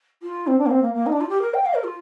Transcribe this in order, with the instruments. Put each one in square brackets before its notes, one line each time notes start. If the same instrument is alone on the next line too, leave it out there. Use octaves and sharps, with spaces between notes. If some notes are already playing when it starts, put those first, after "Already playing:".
[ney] F4
C4
D4
A#3
C4
A#3
A#3
D#4
D4
F4
G4
A#4
G5
F5
A#4
F4